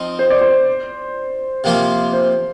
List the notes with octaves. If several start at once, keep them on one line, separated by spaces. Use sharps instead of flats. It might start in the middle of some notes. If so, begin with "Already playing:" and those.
Already playing: F3 C4 D#4
C5
D5
C5
C3 F3 A#3 F4
C5